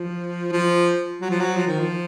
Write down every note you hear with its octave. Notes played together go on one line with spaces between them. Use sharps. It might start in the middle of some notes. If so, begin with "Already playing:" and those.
Already playing: F3
F3
F#3
F3
F#3
F3
D#3
F3